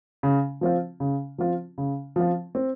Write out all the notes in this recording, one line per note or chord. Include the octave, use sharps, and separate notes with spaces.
C#3
F3 C4 F4
C#3
F3 C4 F4
C#3
F3 C4 F4
C4